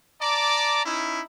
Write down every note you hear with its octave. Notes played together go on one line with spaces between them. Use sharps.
D5 A5 A#5 D6
C#4 D#4 E4